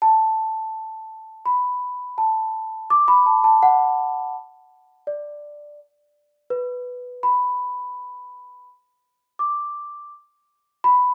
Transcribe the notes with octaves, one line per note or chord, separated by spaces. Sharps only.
A5
B5
A5
D6
B5
A5
A5
F#5
D5
B4
B5
D6
B5